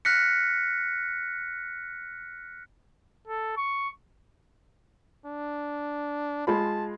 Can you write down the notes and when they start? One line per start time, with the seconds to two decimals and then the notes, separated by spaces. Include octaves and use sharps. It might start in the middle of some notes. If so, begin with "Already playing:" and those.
0.05 F6 F#6 A#6 B6 C#7
3.27 A4
3.57 C#6
5.26 D4
6.47 G#3 F4 A5 B5